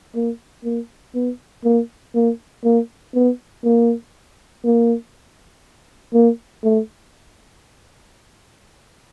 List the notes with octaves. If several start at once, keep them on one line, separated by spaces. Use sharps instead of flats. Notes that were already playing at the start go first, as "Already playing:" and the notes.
A#3
A#3
B3
A#3
A#3
A#3
B3
A#3
A#3
A#3
A3